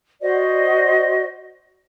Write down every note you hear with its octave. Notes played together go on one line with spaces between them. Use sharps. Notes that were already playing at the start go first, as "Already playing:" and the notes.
F#4 C5 D5 D#5